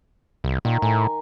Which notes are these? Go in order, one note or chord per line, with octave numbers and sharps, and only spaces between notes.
C2
A#2 D#3
A2 G#5